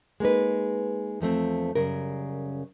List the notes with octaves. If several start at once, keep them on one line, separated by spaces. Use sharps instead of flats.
G#3 A#3 D#4 B4
E2 F3 A3 C4
F#2 C#3 G3 A#4